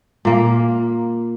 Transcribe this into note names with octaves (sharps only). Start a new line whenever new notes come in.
A#2 A#3